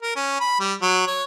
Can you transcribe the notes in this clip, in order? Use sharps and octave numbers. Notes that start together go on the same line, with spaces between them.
A#4
C#4
B5
G3
F#3
C#5